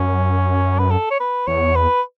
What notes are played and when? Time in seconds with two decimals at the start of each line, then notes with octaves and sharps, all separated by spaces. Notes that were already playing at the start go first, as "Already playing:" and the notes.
Already playing: F#2 C#4
0.79 B4
0.91 A4
1.11 C#5
1.20 B4
1.47 E2 C#5
1.76 B4